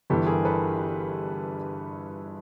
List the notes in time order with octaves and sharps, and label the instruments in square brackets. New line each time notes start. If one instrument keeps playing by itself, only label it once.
[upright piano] G1 G2 E3 [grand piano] G4 A4
[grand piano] G#4 A#4
A4 B4